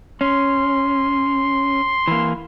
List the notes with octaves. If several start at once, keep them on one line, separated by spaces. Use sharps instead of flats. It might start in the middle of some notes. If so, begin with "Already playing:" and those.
C#4 C6
E3 A#3